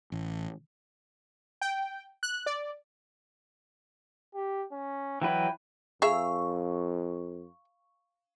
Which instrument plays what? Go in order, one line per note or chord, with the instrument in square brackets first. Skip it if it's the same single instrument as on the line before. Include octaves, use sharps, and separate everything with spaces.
[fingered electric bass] A1
[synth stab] G5
F#6
D5
[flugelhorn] G4
C#4
[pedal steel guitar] E3 F#3 B4 [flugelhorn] G5
[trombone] F2 [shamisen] G#4 E5 [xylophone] F5 A#5 E6 [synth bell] C#6